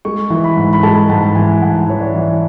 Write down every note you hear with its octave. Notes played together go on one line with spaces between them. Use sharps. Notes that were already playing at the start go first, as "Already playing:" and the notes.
G#3 C#6
E3
B5
G#2
B5
G#3 A5
G#2 A5
E3 G#5
G#2 F#5
E3 C#5
D5
E3